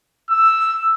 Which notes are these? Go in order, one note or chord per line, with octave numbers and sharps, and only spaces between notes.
E6